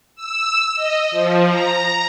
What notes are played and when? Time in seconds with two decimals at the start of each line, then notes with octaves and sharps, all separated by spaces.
0.16 E6
0.75 D#5
1.11 F3
1.47 A#5